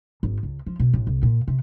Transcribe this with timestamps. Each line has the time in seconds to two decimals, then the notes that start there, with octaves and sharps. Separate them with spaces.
0.23 G#1
0.43 C#2
0.66 F3
0.80 B2
0.93 A1
1.07 C2
1.23 A#2
1.48 C3